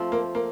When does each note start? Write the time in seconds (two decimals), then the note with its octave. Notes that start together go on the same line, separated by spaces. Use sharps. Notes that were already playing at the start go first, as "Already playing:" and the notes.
Already playing: F3 A3 C4 F4
0.12 A#3
0.35 A#3